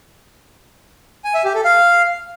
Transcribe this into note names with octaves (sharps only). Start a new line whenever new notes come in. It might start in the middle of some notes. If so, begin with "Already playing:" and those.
G#5
E5
G4
A4
F5